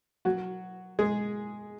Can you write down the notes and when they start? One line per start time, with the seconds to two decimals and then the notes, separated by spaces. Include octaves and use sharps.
0.25 F#3 F#4
0.99 G#3 G#4